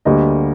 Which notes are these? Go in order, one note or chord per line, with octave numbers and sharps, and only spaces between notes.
D2 D3 G3 A#3 D#5